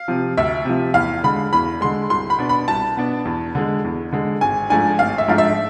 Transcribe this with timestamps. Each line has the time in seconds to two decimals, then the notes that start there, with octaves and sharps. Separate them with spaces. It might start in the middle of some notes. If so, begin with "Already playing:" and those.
Already playing: F5
0.08 C3 F3
0.37 D2 E5
0.65 C3 F3
0.94 E2 F5
1.23 D3 G#3 B5
1.53 E2 B5
1.81 D3 G#3 C6
2.10 C2 C6
2.30 B5
2.39 B2 B3 D4
2.49 B5
2.68 C2 A5
2.97 B2 B3 D4
3.25 E2
3.55 D3 G#3
3.84 E2
4.13 D3 G#3
4.41 G#1 G#5
4.70 G#2 F3 A3 D4 G#5
4.99 G#1 F5
5.18 E5
5.28 G#2 F3 A3 D4 F5
5.38 E5